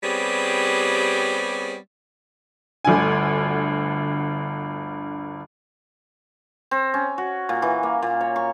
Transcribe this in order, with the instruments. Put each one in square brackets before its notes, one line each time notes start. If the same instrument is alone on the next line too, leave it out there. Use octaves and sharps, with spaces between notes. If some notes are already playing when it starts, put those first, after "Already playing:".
[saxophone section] G3 B3 C4 G4 G#4 C#5
[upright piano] G1 D2 D3 G#5
[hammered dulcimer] C4
C#4
F#4
A#2
E3
A#3
A#2
C#5
C#6